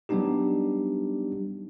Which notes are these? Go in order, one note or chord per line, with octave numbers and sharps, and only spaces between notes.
F#3 G3 B3 D4 D#4 G4